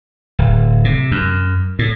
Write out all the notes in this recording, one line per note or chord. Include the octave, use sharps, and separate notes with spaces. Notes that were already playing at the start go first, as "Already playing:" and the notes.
D1
C3
F#2
A2